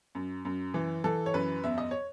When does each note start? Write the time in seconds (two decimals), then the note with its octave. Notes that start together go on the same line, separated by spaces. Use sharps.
0.15 F#2
0.45 F#2
0.74 E3
1.04 E3 A4
1.26 C#5
1.34 F#2 B4
1.64 E2 E5
1.78 D#5
1.91 C#5